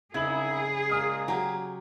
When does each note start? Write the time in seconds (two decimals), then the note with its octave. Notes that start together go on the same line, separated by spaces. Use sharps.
0.14 C2 C#3 D#4 E4 G#4 G#6 F#7
0.90 A#2 G#3 D#6 F6
1.28 F#3 G4 A#5